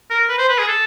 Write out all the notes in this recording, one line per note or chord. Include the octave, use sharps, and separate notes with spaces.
A#4
B4
C5
B4
G#4
A4